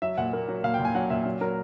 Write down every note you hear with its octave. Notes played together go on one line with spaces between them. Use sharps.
F#3 E5
A#2 F#5
A#3
F#3
A#2 F5
G5
A#2
G#5
F#3 F#5
A#2 E5
F#3
F#3 A#4